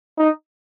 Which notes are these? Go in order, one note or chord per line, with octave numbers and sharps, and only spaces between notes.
D#4